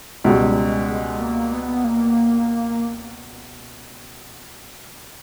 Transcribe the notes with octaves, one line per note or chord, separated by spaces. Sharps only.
C#2 B2 G3 G#3
G#3
A#3
B3
A#3